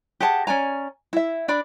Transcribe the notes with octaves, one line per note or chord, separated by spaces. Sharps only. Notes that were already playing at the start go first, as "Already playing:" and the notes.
G4 G#4 F#5 A5
C#4 D5 G#5 A#5
E4 E5
D4 D5 B5